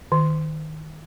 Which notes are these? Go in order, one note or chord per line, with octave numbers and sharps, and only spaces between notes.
D#3